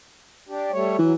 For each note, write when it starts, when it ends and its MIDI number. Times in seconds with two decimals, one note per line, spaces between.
0.48 0.71 62
0.48 0.71 67
0.72 0.97 55
0.72 0.97 57
0.72 0.97 73
0.98 1.14 52
0.98 1.13 54